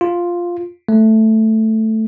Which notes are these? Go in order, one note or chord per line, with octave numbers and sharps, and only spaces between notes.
F4
A3